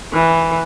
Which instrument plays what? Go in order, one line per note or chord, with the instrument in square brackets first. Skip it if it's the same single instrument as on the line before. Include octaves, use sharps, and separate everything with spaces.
[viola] E3